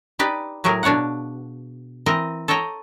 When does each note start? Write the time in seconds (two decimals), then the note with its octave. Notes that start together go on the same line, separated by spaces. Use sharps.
0.19 D#4 G4 B4 D5
0.64 A2 F#3 G4 G#4 A#4
0.83 B2 D4 C#5 F5 F#5
2.06 E3 C4 A#4 D#5
2.48 A4 C#5 D#5 G5 A#5